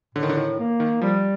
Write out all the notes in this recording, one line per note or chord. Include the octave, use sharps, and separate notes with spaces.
A2 D3
D#3
D3
D#3
A#3
D#3
F3 G3